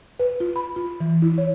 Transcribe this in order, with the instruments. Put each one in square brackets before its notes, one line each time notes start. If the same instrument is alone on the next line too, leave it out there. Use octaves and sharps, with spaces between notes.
[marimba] B4
F4
B5
F4
E3
E4
C#5